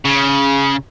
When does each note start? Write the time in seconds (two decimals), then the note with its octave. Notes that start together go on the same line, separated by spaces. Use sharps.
0.05 C#3